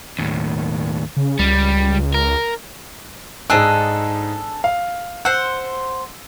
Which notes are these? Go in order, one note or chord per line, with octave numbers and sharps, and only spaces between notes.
D#2 A2
C#3
C#2 G3
A#4
G#2 D4 D#4 G#4 A4 E6
F5
C5 F#5 E6